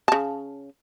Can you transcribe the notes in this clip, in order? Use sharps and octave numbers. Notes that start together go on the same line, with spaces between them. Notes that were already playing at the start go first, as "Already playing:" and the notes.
C#3 A5